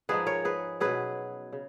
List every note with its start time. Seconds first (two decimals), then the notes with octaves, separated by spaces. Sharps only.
0.09 G#2 F3 G#3 D#4 G#4 B4
0.26 A#4 C#5
0.45 G#4 B4
0.80 B2 F#3 C#4 G#4 B4
1.53 C#3